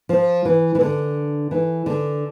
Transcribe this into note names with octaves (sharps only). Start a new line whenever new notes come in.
F3
E3
E3
D3
E3
D3